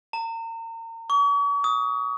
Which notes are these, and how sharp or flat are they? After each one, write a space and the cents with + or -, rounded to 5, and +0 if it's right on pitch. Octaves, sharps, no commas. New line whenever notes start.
A#5 -35
C#6 +45
D#6 +20